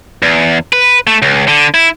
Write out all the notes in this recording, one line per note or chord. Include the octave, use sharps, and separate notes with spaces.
E2
B4
A3
C#2
D3
E4